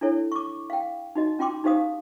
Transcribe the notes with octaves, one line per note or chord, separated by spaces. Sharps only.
D4 E4 A4 C#5
C#6 D6
F5 G5
D#4 F#4 D#5
C#4 F4 G5 C6 D6
D#4 G4 C5 F5 D#6